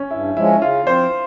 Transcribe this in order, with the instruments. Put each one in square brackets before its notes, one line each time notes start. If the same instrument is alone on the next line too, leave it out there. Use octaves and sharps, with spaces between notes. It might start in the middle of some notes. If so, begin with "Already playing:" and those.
Already playing: [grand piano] C#4
[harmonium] G2 [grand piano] E4
[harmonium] F3 G#3 C#4 [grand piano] E4
[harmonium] C#3 [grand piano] F4
[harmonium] F3 C4 [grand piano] C5